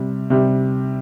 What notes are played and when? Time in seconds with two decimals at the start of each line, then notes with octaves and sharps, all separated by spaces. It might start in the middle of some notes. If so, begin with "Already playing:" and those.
Already playing: C3 G3
0.30 C3 G3